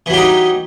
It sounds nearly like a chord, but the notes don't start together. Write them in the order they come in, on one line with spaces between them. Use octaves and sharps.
E3 F#3 G4 D#4